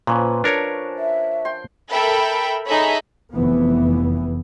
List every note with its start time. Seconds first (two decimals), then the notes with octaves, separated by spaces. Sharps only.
0.07 A#2 F3 C#4 B4
0.44 D4 A#4 C#5 A5
0.98 E5
1.45 G5 C6
1.92 A4 A#4 E5 G5 B5
2.66 D#4 G#4 A4 C#5 E5 B5
3.34 F1 E3 B3